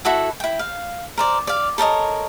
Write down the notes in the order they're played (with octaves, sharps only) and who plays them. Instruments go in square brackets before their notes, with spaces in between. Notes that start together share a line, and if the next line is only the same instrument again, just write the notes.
[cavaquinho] E4 F#4 A4 F#5
E4 G5
F5
A#4 C5 D5
D5 F5
A4 A#4 C#5 D#5